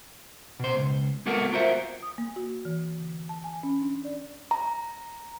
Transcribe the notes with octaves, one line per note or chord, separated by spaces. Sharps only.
B2 C5
C#2
G#3 A#3 B3 F#4 A4 A#4
F4 F#4 A#4 C5 E5
D#6
A#3
F#4
E3
D3
A5
G#5
C#4
D4
D5
A#5